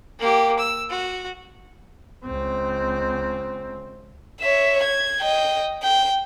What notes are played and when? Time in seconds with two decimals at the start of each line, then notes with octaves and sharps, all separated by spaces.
0.19 A#3 G4
0.59 E6
0.90 F#4
2.25 C#2 C4
4.40 C#5 E5
4.83 G#6
5.20 D#5 G5
5.83 G5